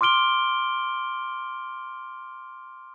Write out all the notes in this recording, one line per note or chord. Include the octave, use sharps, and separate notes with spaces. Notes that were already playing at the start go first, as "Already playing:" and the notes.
C6 D6 F6 D7 G7